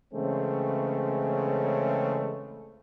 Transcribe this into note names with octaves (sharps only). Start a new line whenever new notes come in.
C#3 E3 G#3 A3 C4 C#4